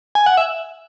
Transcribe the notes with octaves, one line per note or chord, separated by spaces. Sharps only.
G#5
F#5
E5